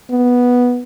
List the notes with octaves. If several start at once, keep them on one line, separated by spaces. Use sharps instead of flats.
B3